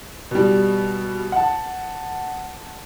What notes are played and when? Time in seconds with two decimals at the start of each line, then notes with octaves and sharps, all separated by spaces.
0.31 B2 G3
1.32 F#5 A5